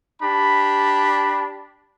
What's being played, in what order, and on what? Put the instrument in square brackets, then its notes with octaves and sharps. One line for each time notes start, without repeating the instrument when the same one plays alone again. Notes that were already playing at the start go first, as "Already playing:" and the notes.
[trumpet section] D4 G4 B5